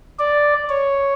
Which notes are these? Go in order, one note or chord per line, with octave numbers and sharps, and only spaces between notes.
D5
C#5